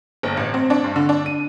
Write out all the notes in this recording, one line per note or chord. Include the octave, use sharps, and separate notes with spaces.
G1
A1
C4
D4
G2
D3
D4
D#7